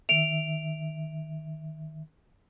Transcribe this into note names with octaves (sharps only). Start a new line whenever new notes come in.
D#3 E5 D7 F7